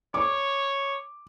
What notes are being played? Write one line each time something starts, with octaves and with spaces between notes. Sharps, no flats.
C#5 D6